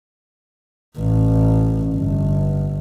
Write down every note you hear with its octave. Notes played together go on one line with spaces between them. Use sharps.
A1
G1